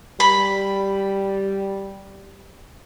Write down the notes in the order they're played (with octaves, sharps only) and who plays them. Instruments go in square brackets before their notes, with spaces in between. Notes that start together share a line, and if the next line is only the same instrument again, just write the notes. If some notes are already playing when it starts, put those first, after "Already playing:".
[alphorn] G3 [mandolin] B5